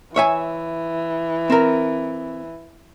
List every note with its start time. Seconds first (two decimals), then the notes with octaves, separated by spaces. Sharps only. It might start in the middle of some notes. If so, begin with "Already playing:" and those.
0.16 E3 C#5 E5 G#5
1.50 C4 A#4